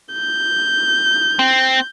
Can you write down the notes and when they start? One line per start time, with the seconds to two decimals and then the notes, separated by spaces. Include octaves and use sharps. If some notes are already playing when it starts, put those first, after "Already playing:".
0.14 G6
1.39 C4